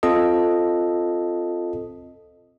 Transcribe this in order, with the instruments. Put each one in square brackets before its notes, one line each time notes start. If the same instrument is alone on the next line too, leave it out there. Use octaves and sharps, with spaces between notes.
[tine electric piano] C4 F4 A4 D#5